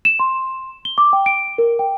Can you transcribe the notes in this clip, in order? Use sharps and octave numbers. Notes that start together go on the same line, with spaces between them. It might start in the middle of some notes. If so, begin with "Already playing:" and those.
E7
C6
G7
D6
G5
D7
A#4
G5